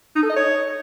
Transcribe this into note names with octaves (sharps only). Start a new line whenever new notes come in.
D#4
A4
D#5
C#5